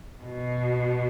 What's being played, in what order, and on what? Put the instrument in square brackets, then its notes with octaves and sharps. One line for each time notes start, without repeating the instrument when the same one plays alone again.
[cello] B2